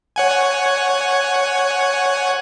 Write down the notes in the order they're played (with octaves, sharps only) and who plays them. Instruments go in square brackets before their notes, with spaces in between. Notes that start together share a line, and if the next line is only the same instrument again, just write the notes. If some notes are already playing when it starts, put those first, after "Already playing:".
[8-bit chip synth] C#5 F#5 G#5